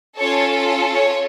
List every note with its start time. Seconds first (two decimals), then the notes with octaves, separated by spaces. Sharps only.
0.18 C#4 F4 A4 C#5
0.92 C#5